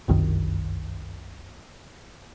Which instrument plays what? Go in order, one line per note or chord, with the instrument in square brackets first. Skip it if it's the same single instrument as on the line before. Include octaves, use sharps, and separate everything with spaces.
[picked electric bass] G1 C2 F#2 D#3